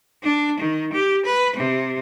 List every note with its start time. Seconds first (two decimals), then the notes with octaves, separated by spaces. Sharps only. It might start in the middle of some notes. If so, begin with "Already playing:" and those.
0.23 D4
0.60 D#3
0.92 G4
1.25 B4
1.56 C3